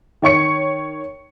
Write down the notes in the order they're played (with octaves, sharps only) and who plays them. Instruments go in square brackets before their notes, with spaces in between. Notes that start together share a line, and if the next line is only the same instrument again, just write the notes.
[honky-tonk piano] D#3 C#5 C#6 C#7